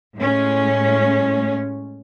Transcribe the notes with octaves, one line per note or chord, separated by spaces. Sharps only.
A2 G#3 C#4